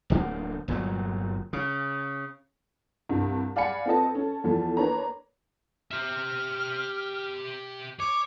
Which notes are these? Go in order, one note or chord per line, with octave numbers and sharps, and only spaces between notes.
D1 D3 A#3
G1 A#2 C#3 F#3
C#3
C2 G2
D5 F5 F#5 G#5 B5 C#7
C4 F4 A4 B4 D#5 A5
C#4 A4
E2 F3 A4
A#3 D4 B4 C#5 A#5
G4 E5 F6
C#5 D6